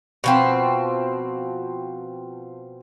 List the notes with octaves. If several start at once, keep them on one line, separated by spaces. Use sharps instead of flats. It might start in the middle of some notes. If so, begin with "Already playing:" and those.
B2 F3 C4